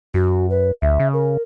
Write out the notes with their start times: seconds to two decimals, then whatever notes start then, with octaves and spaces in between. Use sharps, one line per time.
0.14 F#2 F#4
0.50 B4
0.82 D2 E5
1.00 C#3
1.13 A#4